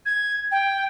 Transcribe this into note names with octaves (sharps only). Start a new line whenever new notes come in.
G#6
G5